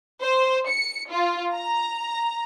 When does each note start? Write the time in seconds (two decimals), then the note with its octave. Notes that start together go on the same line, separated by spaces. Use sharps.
0.21 C5
0.68 C#7
1.10 F4
1.54 A#5